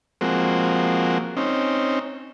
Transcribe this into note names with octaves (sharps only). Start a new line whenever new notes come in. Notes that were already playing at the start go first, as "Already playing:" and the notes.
F3 G#3 A#3 C4 F#4
C4 C#4 D#4